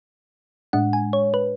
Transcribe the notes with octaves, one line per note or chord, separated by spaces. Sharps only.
A2 G#3 D4 F#5
G#5
C#5
B4